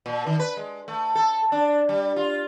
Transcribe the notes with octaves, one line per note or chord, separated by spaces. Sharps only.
A#2
D#3
B4
G#3
A3
A4
D4
G3
F4